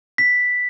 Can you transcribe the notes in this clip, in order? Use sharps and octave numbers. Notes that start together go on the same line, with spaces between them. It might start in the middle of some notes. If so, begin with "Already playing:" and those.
B6